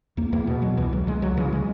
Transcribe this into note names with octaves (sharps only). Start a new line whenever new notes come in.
E2 A#3
E2 A#3
B2
E2 F#3
C#2 E3
C#2 F#3
C#2 G#3
C#2 F#3
C#3 E3
G#3